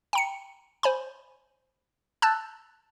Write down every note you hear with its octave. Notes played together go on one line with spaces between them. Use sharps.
G5 A#5 C#7
C5 G#5 B5
A5 E6 F#6 G6 A6